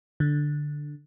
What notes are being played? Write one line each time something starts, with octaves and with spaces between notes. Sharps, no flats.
D3